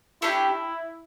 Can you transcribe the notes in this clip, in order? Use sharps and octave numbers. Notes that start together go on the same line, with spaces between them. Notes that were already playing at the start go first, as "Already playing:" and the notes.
A3 D4 E4 G4